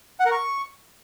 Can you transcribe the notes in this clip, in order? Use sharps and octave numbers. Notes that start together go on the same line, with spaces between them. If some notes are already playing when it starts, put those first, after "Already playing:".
F#5
A#4
C#6